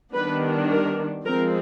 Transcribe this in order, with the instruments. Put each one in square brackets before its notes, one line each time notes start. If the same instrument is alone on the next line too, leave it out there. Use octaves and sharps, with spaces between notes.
[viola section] D#3 G3 B3 D4 B4
A#4
F3 G#3 C4 A#4